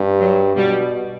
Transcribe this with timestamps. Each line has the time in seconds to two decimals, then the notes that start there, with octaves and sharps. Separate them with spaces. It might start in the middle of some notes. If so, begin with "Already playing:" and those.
Already playing: G2
0.20 F#3
0.56 B2 G3